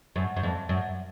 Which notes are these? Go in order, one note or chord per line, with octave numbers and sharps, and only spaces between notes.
F#2
F#2
F2
F#2